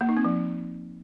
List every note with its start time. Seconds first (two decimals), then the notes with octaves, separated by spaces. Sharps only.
0.01 A#3
0.09 D#4
0.17 C4
0.25 F3